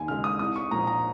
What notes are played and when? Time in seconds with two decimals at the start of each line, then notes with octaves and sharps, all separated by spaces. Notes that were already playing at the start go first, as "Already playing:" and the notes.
Already playing: D#2 G#5
0.08 C#3 G#3 F6
0.24 D#6
0.39 C2 D#6
0.56 C#6
0.71 A#2 F3 A#5
0.87 A#5